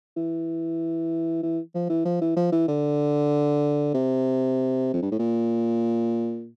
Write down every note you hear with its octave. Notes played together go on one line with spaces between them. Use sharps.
E3
E3
F3
E3
F3
E3
F3
E3
D3
C3
F2
G2
A2
A#2